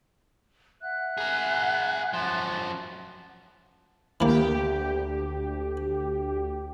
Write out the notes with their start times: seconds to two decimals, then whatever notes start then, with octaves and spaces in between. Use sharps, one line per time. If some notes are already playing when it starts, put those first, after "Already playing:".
0.81 E5 F#5 F#6
1.18 G#4 A#4
2.13 F#2 F3
4.21 D2 E3 A#3 G4